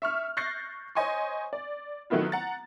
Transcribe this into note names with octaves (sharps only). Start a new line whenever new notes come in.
E5 C#6 F6
C#6 F#6 G6 A6 A#6 C7
C5 C#5 D#5 G#5 C6 C#6
D5
D#3 F#3 A3 B3 E4 F4
F#5 A#5 A6